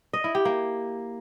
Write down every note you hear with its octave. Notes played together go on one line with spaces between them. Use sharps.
D#5
E4
G4
A#3